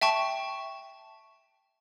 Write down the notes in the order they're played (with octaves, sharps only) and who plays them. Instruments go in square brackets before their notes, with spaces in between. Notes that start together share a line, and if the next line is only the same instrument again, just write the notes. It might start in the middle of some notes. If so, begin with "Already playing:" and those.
[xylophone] E5 G5 A5 C#6